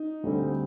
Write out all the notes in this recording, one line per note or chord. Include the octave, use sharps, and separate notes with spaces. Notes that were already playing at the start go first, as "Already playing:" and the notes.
Already playing: D#4
D2 D3 G3 C4